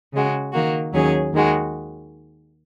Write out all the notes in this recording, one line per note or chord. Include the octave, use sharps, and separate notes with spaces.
C#3 G#3 F#4
D#3 A#3 F#4
D#2 D#3 F#3 C#4 G#4
D#2 D#3 G#3 F#4